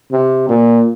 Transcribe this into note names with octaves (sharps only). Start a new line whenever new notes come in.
C3
A#2